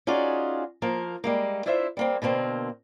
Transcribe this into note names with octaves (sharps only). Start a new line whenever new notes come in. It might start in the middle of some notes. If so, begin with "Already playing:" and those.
C#4 D#4 F4 F#4 G#4 D5
F3 A#3 A#4
G3 G#3 A#3
D4 E4 F4 C5 E5
G3 A#3 C4
B2 D3 A#3 C4